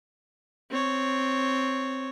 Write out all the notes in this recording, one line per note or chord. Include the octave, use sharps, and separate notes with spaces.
C4 C#5